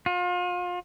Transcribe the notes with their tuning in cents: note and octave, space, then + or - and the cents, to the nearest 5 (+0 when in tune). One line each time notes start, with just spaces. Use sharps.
F4 +35